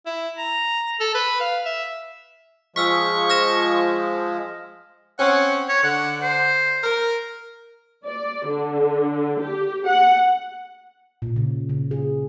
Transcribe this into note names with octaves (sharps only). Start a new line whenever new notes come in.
E4
A#5
A4
B4
F5
E5
F3 G#3 C#6 E6 F6 B6
F6 A#6 E7
C4 C#4 F#5
C#5
D3 F#5
C5
A#4
D5
D3
G4
F#5
A#2
C#3
C#3
G#4